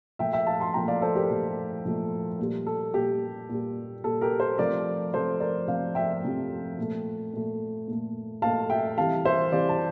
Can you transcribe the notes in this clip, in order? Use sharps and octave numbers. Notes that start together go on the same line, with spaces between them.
A#2 F3 A3 E5 G5
E5 G5
F5 A5
A5 C6
A#2 F3 A3 G5 A#5
D5 F5
A4 C5
G4 A#4
A#2 F3 A3
A#2 F3 A3
A#2 G3
A4
A#2 G3 G4
A#2 G3
A#2 G3 A4
G4 A#4
A4 C5
C3 F3 A3 A#4 D5
C3 F3 A3 A4 C5
A#4 D5
C3 F3 A3 D5 F5
E5 G5
C3 F3 A3
A#2 A3
A#2 A3
A#2 A3
A#2 A3 F5 A5
E5 G5
C3 E3 G3 F5 A5
C5 E5
C3 E3 G3 D5 F5
A5